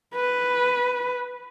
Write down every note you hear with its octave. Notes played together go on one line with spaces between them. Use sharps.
B4